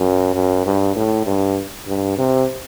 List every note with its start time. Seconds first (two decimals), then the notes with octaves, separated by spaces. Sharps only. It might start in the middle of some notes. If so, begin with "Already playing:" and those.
Already playing: F#2
0.35 F#2
0.66 G2
0.96 A2
1.26 G2
1.87 G2
2.18 C3